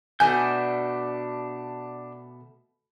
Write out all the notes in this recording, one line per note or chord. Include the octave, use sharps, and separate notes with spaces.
B2 A3 D4 D5 G#5 G6